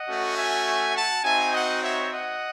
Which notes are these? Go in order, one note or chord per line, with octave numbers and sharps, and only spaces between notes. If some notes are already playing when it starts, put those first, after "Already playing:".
Already playing: D#5 F#5
A3 C#4 F#4
E5 G#5
F#5 A5
C4 D#4 F#4 E5 G#5
D#5 F#5
C#5 E5
D#5 F#5